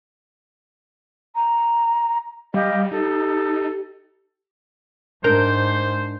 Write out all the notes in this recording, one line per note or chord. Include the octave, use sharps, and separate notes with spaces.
A#5
G3 G4 D#5 F5
D#4 G4 A4
G#2 D4 A#4 C5 G6